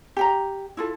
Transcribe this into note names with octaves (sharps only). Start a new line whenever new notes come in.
G4 G5 A#5
E4 F4 A4